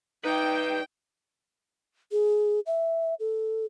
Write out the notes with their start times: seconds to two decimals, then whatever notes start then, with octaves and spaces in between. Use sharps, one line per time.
0.25 D#4 B4 D5 G5
2.12 G#4
2.66 E5
3.20 A4